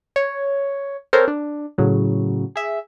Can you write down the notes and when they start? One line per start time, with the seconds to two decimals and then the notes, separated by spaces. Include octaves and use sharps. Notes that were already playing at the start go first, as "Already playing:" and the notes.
0.16 C#5
1.13 C4 A4 A#4 C5 C#5
1.28 D4
1.78 A2 C#3 F#3
2.56 G#4 E5